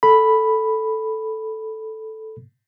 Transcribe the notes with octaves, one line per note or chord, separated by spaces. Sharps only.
A4 B5